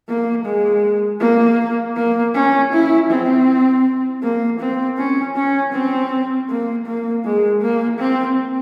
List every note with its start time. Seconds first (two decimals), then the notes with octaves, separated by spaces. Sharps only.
0.09 A#3
0.45 G#3
1.21 A#3
1.96 A#3
2.35 C#4
2.72 E4
3.10 C4
4.23 A#3
4.60 C4
4.98 C#4
5.36 C#4
5.73 C4
6.49 A#3
6.86 A#3
7.25 G#3
7.61 A#3
7.99 C4